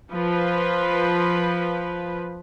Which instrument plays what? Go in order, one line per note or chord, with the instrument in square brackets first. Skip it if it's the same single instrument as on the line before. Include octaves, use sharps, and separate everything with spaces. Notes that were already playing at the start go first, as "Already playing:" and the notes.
[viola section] F3 B4